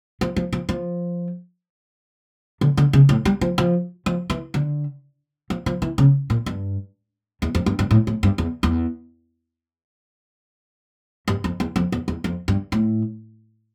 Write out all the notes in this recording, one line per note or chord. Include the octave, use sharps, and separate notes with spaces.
F3
F3
F3
F3
D3
D3
C#3
A2
G3
F3
F3
F3
E3
D3
F3
F3
E3
C#3
A#2
G2
E2
F2
G2
G2
A2
A2
G2
E2
E2
G2
F2
E2
F2
E2
E2
F2
G2
A2